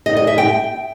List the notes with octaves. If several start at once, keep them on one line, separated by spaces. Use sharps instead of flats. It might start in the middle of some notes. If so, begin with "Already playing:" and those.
D#5
D#5
E5
G5